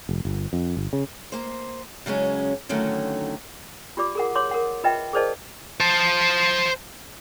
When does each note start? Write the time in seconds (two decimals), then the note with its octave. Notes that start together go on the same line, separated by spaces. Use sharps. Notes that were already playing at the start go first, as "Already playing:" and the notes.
0.09 F1
0.25 G1
0.53 F2
0.77 G1
0.93 C#3
1.32 A#3 C5
2.06 C#3 F#3 G#3 C#4
2.69 D3 D#3 F#3 A3 C#4
3.97 F4 G4 D5 D6
4.15 G#4 A#4 F#5
4.35 C#5 C6 D6
4.51 A#4 F#5
4.84 F4 B4 D#5 E5 G5
5.13 G#4 A#4 C5 D5 D#5 A5
5.80 C5 A5